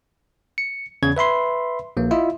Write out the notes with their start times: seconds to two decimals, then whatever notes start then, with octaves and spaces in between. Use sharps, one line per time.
0.58 C#7
1.03 E2 C#3 C#4 G#6
1.17 B4 E5 B5 C6
1.97 A#1 A#3
2.11 E4 F4 D#5 E5